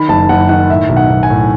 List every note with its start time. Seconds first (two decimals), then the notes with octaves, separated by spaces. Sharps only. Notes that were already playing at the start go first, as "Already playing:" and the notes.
Already playing: D#3 B5
0.09 F#1 A5
0.29 F#1 F#5
0.49 D#3 F#5
0.70 A2 E5
0.89 B1
0.97 F#5
1.10 B1
1.23 G#5
1.30 A2